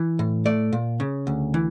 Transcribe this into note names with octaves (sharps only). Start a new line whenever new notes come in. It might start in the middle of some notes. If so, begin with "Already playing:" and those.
Already playing: E3
A2
A3 D5
A#2
C#3
D2
E3